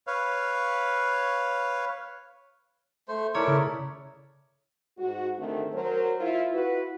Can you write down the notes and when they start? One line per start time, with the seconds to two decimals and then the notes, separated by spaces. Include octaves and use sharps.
0.07 B4 C#5 F5
3.08 A3 C5
3.34 A3 E4 A#4 C#5 D5
3.47 C#3
4.98 G#2 F#4
5.37 G#2 D3 D#3 A3 C4
5.73 F#3 A#4 C5
6.20 E4 F4
6.52 E4 F#4 B4